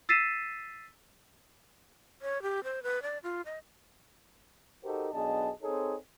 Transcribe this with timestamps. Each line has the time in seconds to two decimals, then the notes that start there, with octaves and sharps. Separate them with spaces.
0.09 E6 A6 B6 C7 D#7 E7
2.22 C#5
2.42 G4
2.64 C5
2.83 B4
3.02 D5
3.23 F4
3.45 D#5
4.84 D#4 F#4 G4 A4 A#4 C5
5.13 B1 B3 D4 G#4 D#5 A5
5.63 C4 D#4 G#4 A4 C#5